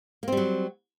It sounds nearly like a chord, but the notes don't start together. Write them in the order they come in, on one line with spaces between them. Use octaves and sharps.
A#3 C4 G3 F#3